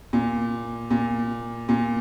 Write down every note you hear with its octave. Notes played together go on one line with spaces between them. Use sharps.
A#2
A#2
A#2